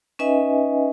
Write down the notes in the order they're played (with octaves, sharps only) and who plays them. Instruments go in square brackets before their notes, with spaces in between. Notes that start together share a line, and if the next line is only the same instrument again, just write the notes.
[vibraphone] C#4 D#4 B4 D#5 E5 G#5